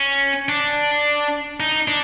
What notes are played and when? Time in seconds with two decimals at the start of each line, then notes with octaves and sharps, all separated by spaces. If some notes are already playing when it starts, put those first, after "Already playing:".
Already playing: C#4
0.49 D4
1.60 D#4
1.88 D4